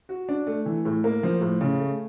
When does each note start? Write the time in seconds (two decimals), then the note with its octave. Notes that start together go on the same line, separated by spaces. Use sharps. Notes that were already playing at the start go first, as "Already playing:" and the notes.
0.09 F#4
0.29 D4
0.47 A3
0.66 E3
0.85 A2
1.04 A#3
1.23 F3
1.41 A2
1.61 C#3
1.79 A3